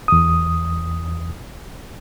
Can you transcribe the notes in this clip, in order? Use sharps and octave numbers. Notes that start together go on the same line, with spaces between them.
E2 D#6